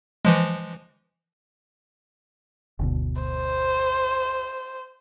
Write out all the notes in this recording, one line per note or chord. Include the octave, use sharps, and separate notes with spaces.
E3 F3 G#3
F#1 D2 B2
C5